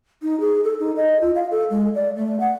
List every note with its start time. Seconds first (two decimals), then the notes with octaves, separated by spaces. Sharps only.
0.23 D#4
0.40 G#4
0.64 A4
0.80 D#4
0.96 D#5
1.21 F4
1.36 F5
1.51 A4
1.70 G#3
1.95 D5
2.16 A3
2.40 F#5